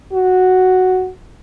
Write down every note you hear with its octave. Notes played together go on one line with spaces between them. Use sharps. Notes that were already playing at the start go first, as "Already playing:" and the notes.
F#4